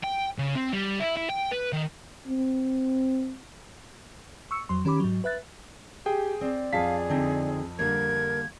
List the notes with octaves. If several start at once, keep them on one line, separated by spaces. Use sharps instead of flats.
G5
C#3
C4
G3
E4
E4
G5
B4
D#3
C4
C#6 E6 C#7
F2 F#3 C6
D#3 C#4 G4 B5 D6
G#2 F#3
B4 E5 F#6 A6
G4 G#4 G5
C4 D5
F2 G#4 F5 A5 B6
D3 C4 D#4
D3 G3 A#3 A#4 G#6